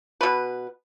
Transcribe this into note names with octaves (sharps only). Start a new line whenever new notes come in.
B2 B4